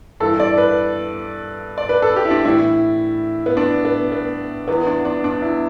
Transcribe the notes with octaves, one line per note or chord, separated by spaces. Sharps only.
G2 E3 A4
D5
B4
D5
B4
A4
G4
E4
D4
A2 E3 E4
B3
D4
B3
B3
E2 E3 B3
D4
D4
D4
E4